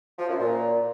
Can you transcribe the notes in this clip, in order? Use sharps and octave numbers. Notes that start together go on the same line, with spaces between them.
F3
F#2
A#2